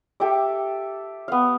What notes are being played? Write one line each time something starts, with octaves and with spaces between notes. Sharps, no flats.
G4 A4 E5 D6
B3 F5